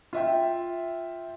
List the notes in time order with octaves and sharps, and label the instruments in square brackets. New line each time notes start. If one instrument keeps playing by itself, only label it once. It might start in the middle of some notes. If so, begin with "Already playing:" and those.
[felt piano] F4 E5 G5